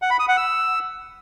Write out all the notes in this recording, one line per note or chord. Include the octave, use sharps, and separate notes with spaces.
F#5
B5
D#6
F#5
E6